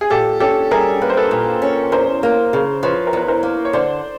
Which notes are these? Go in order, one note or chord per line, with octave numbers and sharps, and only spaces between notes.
G#4
A#2 G4 A4
C#4 G4 A4
G3 G#4 A#4
A#3 B4
C5
A4 B4
A#2
C#4
E2 A#4 C5
A#3
C#3
F3 B4 C#5
A#4
E2 B4
A#4 C5
A#3
C#5
D3 C5 D5